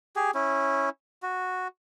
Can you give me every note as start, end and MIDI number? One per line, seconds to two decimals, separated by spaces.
0.16 0.31 67
0.16 0.31 68
0.35 0.89 61
0.35 0.89 64
1.23 1.68 66